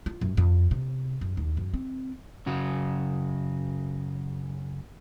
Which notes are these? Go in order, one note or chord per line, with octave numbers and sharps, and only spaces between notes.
F4
F#2
F2
C3
F#2
D#2
F#2
C4
F#2 C#3 F#4